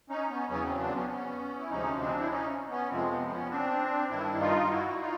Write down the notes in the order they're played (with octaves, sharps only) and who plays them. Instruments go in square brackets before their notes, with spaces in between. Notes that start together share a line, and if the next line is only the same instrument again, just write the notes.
[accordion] C#4 D#4
B3 C#4
E2 C#3 F#3 B3 C#4
C4
C4 D4
B3 C#4
B3 C#4
E4
D2 C3 F3 G#3 C#4 D#4
C4 D4
E4
C#4 D#4
B3 C#4
F2 C3 F3 G#3 C4
B3
B3 C#4
C4 D4
G2 D#3 G3 D4 E4
D#4 F4
E4 F#4
E4
D#4 F4